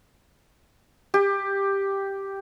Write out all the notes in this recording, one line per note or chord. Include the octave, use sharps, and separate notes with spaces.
G4